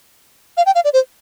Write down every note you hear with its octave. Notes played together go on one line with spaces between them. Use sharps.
F5
G5
F5
D5
C5